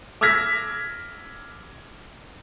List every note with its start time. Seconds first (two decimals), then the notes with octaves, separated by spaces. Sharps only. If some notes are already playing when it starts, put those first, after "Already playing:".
0.21 D6 E6 F6 G#6 A#6 B6